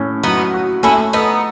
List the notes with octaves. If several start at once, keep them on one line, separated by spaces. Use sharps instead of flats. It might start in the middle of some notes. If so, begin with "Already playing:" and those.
Already playing: A2 C#4
F#3 B3 D#4
F#4
A3 C#4 E4
B3 D#4 A4